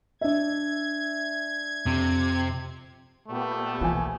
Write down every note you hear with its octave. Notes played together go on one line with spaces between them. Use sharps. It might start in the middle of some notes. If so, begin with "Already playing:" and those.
D4 E5 G#6
F2 C3
A#2 A3 B3 G4
B1 E3 F3 G#5